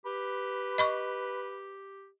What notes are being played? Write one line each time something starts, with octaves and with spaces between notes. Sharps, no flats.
G4 B4
D#5 B5 C#6